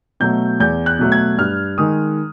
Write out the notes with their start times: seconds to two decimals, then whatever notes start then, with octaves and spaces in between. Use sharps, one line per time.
0.20 B2 F#3 A3 G6
0.60 E2 G6
0.86 F#6
0.99 B2 F#3 A3
1.12 G#6
1.38 G2 F6
1.78 D#3 G#3 D#6